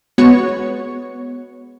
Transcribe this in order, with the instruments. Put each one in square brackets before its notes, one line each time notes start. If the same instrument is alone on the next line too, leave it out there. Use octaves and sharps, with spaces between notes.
[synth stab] G#3 B3 F#4 C#5 C#6